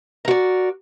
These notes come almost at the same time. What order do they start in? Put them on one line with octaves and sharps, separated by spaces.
A#4 F#4 D5